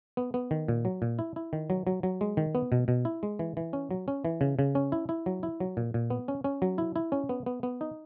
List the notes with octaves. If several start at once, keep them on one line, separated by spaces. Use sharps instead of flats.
B3
B3
D#3
A#2
F#3
A#2
E4
E4
D#3
F#3
F#3
F#3
G#3
D#3
B3
B2
B2
E4
G#3
E3
E3
C#4
F#3
C#4
E3
C#3
C#3
C#4
E4
E4
F#3
E4
F#3
A#2
A#2
B3
C#4
C#4
F#3
E4
E4
C#4
B3
B3
B3
D#4